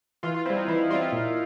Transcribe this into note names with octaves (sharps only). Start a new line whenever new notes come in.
E3 F4
F4
G3 C4 E4
D#4
E3 E4
G3 C4 F4
A#2